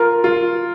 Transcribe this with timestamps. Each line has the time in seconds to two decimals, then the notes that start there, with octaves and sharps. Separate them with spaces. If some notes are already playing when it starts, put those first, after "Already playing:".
Already playing: F4 A#4
0.24 F4